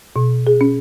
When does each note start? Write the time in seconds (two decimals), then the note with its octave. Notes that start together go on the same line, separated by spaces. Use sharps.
0.16 B2
0.47 G#4
0.61 C#4